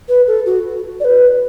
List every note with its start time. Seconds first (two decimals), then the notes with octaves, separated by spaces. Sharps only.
0.09 B4
0.27 A4
0.46 F#4
1.00 D5
1.04 B4